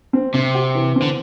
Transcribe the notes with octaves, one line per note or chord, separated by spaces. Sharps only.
C4
C3 C4
G4
E3
C4
D3